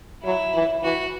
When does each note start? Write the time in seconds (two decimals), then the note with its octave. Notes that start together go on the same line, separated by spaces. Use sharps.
0.24 F#3 E4
0.54 E3
0.83 E3 F#4